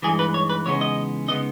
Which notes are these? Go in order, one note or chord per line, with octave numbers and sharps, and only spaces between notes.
G2 E3 G#3 D#4 G#4
B4
C#5
B4
E2 C#3 G#3 B3 D#4 C#5
D#5
C#3 G#3 B3 D#4 D#5